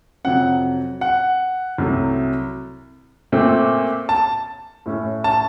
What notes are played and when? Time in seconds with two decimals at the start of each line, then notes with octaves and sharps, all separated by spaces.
0.24 F2 C3 F#3 F#5
1.01 F#5
1.78 C2 C3 F#3 A3
3.32 A#2 A3 C4
4.09 A5
4.86 A2 A3 C#4
5.24 A5